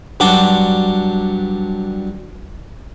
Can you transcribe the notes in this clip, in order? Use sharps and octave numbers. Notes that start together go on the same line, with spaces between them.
G2 F#3 D4 F#4 C6 D6